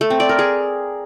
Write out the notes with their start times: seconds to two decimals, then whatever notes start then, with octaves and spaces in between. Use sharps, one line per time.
0.01 A3
0.10 C4
0.20 D5
0.29 A#4
0.39 G#4